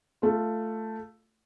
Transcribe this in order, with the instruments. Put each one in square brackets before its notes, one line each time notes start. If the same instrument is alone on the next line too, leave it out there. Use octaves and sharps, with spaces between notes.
[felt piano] A3 F4